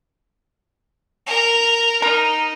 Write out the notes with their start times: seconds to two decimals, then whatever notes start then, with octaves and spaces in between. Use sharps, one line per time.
1.26 A#4 A#5
2.02 D#4 A#4